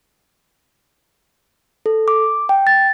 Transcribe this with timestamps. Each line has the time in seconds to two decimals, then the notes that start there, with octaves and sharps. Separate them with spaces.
1.86 A4
2.08 D6
2.49 G5
2.67 A6